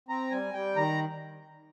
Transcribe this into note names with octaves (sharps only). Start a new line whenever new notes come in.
C4 A#5
G3 G#5
G3 G5
D#3 A#5